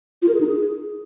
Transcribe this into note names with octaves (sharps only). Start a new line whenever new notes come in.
F4
A#4
G#4
D#4
G#4